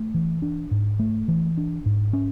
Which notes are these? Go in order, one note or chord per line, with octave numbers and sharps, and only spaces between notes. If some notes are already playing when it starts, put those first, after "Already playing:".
Already playing: A3
E3
D4
G#2
A3
E3
D4
G#2
C#4